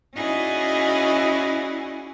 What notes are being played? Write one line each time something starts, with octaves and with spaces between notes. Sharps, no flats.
C#4 D#4 E4 F#4 G#4 D5